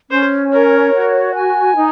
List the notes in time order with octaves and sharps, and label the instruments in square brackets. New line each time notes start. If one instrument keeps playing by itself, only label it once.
[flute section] C#4 [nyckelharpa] C5
[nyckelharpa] A#4 [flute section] C#5
[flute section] F#4
G#5
D#4